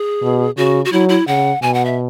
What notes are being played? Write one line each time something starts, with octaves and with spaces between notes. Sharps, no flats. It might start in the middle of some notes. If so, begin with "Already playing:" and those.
Already playing: G#4
B2
C#3 F#4
F#4
F#3 E4
E4
C#3 F#5
B2 G#5
F#5
E5